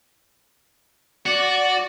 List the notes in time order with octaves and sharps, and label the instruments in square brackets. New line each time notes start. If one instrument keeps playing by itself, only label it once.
[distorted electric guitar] F#4 [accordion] D5